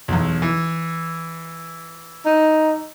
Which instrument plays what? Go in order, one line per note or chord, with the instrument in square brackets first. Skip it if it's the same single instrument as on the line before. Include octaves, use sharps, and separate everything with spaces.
[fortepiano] B1 E2
E3
[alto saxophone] D#4